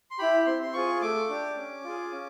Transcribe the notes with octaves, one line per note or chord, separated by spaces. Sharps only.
C6
E4 G4 B5
C4 C6
C6
F4 G#4 C#6
A3 D6
D4 G4
C#4
F4 G#4
C#4